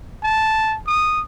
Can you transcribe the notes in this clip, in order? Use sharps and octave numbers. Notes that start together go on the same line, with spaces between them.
A5
D#6